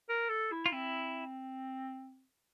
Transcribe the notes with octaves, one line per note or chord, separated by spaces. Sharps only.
A#4
A4
E4
F4
C4 E4